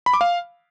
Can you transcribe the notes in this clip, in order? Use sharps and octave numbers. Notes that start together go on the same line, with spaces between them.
B5
D6
F5